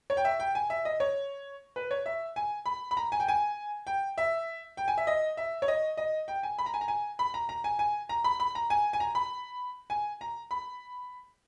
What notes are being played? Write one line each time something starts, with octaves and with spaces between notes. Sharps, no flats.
C#5
G5
E5
G5
G#5
E5
D#5
C#5
B4
C#5
E5
G#5
B5
B5
A#5
G#5
G5
G#5
G5
E5
G5
G#5
E5
D#5
E5
C#5
D#5
D#5
G5
G#5
B5
A#5
G#5
A#5
G#5
B5
A#5
A#5
G#5
G#5
A#5
B5
B5
A#5
G#5
G#5
A#5
B5
G#5
A#5
B5